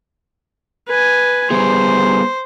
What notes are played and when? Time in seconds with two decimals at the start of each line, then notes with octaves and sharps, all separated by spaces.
0.88 B4 G#5
1.50 G3 B3 G#4 C5